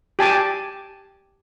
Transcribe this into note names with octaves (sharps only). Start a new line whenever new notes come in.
G4 G#5 A5 D6